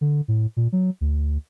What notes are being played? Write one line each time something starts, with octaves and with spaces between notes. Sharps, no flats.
D3
A2
A#2
F#3
D2